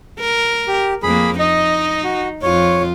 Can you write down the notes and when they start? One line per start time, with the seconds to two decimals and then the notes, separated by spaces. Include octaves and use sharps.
0.20 A#4
0.68 G4
1.03 F2 A#3 G#4 B5
1.39 D#4 D#5
2.04 F#4
2.42 F2 F4 C#5